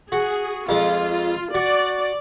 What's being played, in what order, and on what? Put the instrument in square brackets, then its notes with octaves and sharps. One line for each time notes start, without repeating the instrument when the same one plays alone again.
[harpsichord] F#4 [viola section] G#4
[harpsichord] F2 G#3 [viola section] F4
[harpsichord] F#4 [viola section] D5